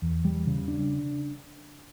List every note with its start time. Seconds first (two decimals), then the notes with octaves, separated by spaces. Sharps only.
0.02 E2
0.25 G3
0.47 C#3
0.68 D4